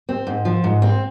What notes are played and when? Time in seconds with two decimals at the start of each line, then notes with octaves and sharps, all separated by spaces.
0.09 C4
0.27 G#2
0.45 F3
0.64 G#2
0.82 C4